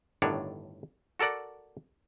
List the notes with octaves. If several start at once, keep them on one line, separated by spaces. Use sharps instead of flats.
G1 A2 D#3 D4 C#5 F#5
F#4 A4 A#4 D5 F#5